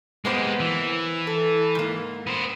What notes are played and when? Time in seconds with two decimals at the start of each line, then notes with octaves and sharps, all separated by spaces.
0.25 G#3 A#3 B3 G4 C5
0.60 E3
1.27 A4
1.75 G#2 A#3
2.27 B3 C5